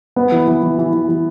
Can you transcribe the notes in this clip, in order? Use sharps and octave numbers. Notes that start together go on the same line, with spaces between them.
B3
E3
E3
E3
E3
E3
E3